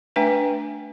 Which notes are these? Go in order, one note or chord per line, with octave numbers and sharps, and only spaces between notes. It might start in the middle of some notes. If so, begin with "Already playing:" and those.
A3 D4 B4 G5 G#5